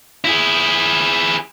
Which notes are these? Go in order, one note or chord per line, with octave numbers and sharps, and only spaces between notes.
E4 G#4